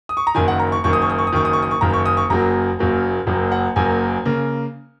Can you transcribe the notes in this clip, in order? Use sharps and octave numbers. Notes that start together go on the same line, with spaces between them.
D#6
C#6
A#5
F#1 F#2 D#3 G#5
F#5
A#5
C#6
F#1 F#2 D#3 C#6
D#6
C#6
D#6
C#6
D#6
F#1 F#2 D#3 C#6
D#6
C#6
D#6
C#6
F#1 F#2 D#3 A#5
C#6
D#6
C#6
F#1 F#2 F#3 A#3 A#5
F#1 F#2 F#3 A#3
F#1 F#2 F#3 A#3
F#5
F#1 F#2 F#3 A#3 G#5
C#3 A#3